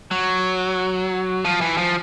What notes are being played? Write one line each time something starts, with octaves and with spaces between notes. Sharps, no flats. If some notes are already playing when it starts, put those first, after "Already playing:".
F#3
F3
E3
F3